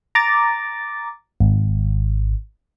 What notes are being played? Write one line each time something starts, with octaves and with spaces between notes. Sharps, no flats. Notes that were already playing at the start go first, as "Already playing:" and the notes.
A#5 D6 A6
G#1